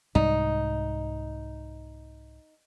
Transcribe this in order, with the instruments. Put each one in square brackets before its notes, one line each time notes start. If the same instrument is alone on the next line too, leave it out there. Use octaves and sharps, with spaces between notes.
[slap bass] C2 G#2 G3 [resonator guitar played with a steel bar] D#4